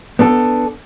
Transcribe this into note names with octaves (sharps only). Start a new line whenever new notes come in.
B3 D4 A4